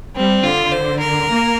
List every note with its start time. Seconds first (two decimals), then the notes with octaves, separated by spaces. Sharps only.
0.16 G3 C4
0.43 D3 F4
0.72 C5
1.00 A#4
1.28 A#3